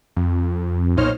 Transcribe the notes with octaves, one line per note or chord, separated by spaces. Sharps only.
F2
B1 A#2 D#4 C5 C#5 F6